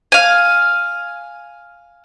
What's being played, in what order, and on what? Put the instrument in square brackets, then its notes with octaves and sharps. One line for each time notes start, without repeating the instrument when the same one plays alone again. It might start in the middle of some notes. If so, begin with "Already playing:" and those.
[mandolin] F5 G#5